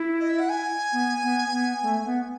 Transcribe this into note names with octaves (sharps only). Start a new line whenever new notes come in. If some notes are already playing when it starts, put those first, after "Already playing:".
Already playing: E4
D#5
E5
F#5
G#5
B3
B3
B3
A3
B3